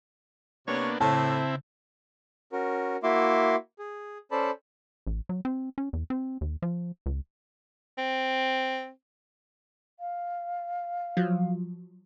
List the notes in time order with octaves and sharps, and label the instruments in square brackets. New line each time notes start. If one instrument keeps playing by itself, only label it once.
[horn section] C3 C#5 [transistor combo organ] A#3 B3 D4
[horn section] A2 [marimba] C#3 [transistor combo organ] C4 E4 [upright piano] A5
[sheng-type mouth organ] C#4 F#4 A#4
A#3 E4 F#4 E5 C6 D6
G#4
C#4 A4 C5 D5 A5 B5
[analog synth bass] A1
F#3
C4
C#4
E2
C4
D#2
F3
C#2
[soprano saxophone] C4
[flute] F5
[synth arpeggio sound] F3 F#3